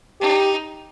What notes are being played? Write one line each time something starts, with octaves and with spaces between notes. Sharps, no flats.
D#4 G4